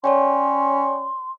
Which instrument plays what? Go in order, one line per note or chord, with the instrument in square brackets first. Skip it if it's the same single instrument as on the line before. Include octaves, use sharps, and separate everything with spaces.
[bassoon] C#4 [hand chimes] C#5 D5 G5 [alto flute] C6